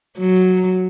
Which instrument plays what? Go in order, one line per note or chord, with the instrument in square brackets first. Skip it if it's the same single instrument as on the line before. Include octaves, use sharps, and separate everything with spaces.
[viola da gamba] F#3